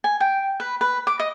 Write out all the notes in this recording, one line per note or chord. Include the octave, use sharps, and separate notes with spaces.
G#5
G5
B4
B4
D6
D#5